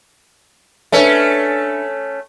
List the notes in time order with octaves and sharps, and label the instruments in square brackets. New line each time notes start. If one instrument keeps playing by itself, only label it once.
[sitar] A3 C#4 [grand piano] D4 B4 E5